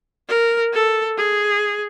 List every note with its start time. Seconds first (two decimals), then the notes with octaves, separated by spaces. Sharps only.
0.28 A#4
0.73 A4
1.17 G#4